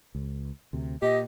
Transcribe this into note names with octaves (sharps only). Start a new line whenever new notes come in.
C#2
D2 C3
A#2 G4 D#5